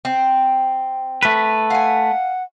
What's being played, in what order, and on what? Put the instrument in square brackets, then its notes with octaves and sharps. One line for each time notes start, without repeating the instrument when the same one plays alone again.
[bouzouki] C4
[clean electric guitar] A3 B4
[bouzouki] F5 G#5 [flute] F#5